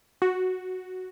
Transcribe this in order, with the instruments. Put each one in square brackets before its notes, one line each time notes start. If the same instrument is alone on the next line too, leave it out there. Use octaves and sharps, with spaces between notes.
[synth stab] F#4